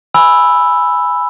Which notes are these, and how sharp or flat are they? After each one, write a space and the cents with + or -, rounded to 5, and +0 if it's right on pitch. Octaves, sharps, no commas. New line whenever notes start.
G#5 +0 B5 +0 E6 +0